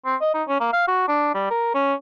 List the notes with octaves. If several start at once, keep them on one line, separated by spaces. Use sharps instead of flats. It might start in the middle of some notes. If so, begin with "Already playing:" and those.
C4
D#5
D#4
C#4
A#3
F5
F#4
D4
G3
A#4
C#4